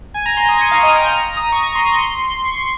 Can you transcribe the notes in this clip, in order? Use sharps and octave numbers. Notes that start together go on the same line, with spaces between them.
G#5
A#5
C6
D#6
C#6
F5
D#5
G5
A#5
A#5
D#6
C#6
A#5
C6
C6
C#6